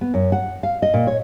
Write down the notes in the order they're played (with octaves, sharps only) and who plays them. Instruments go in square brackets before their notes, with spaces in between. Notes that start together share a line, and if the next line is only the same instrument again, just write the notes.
[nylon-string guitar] B3
F#2
F#5
F5
D#5
A#2
C#5